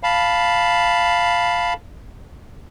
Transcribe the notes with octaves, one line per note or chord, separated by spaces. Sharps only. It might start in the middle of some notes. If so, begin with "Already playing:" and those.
F5 A5 B5